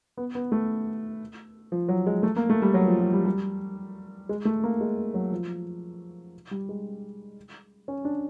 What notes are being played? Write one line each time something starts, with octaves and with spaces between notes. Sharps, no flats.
B3
B3
A3
F3
F#3
G#3
A3
A#3
A3
G3
F#3
F3
F#3
G3
G3
G#3
A3
A#3
G#3
F#3
F3
G3
G#3
C#4
D4